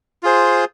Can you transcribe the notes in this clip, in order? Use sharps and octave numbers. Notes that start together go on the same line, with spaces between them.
F4 G#4 C5